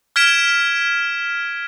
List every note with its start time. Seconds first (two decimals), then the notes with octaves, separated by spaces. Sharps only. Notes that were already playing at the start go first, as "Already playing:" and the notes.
0.16 F6 G#6 B6 D7 E7